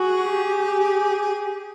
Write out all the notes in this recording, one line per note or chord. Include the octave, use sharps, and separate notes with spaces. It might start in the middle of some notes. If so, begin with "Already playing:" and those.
Already playing: F#4 G#4
G4